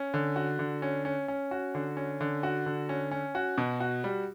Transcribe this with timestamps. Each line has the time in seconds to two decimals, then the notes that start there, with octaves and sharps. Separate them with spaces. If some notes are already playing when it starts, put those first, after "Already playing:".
Already playing: C#4
0.14 D3
0.36 F#4
0.59 D3
0.82 C#4
1.05 C#4
1.28 C#4
1.51 F#4
1.75 D3
1.97 C#4
2.21 D3
2.43 F#4
2.66 D3
2.89 C#4
3.11 C#4
3.35 F#4
3.58 B2
3.80 F#4
4.04 G3